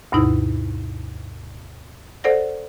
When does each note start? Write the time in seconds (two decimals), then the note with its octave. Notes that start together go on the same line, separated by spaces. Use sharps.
0.12 D2 G2 B2 D#4 E4
2.24 A4 C5 D5 F#5 A#6